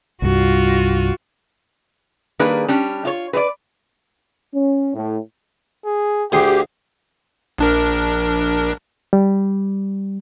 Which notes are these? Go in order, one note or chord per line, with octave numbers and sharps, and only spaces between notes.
C2 G2 F4 F#4
D#3 G3 A#3 D4 G#4 B4
G3 C#4 D4
F4 C#5
B4 C5 D5
C#4
A2
G#4
D2 G4 G#4 G5 C6
A#1 D4 A#4
G3